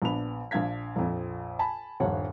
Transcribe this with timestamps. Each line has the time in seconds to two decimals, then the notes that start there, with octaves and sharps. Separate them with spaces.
0.02 A#1 B3 D4 B5 F7
0.51 A#1 D4 F5 G#6 B6
0.96 A#1 F2
1.59 G#5 A5 B5
2.00 D#1 A#1 G2 C#5 F#5